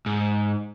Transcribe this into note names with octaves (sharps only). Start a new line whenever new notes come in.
G#2